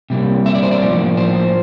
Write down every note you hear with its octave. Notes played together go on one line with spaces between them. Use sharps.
C3 G3 A#3
E5
D5
C5
D5
A2 F3 A#3
C5